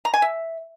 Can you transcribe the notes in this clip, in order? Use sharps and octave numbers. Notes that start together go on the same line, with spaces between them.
A#5
G#5
E5